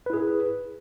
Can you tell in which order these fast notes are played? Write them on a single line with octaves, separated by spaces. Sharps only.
B4 E4 G#4